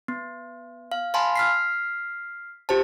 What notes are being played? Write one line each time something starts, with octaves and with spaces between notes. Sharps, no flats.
B3
F5
F5 G#5 A5 B5 C6
F6 B6 C7
F4 G4 C5 A5